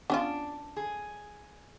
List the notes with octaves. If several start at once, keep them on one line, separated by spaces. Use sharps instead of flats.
B3 C#4 D4 F4
G#4